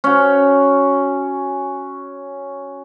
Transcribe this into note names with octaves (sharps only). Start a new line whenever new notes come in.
C#4 F#4